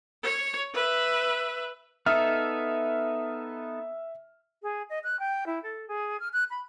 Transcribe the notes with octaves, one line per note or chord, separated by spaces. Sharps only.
C#5
B4 E5
B3 D#4 A4 E5 F6
G#4
D#5
F#6
G5
E4
A4
G#4
F6
F#6
B5